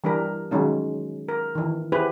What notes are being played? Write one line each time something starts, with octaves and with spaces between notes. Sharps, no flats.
E3 G3 D4 G4 A#4
D#3 F#3 G#3 C#4 D#4
A#4
D#3 E3
E4 G4 G#4 B4 C5